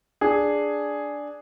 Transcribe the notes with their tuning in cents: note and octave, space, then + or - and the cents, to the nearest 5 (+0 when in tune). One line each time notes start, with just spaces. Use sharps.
D4 +0 G#4 +0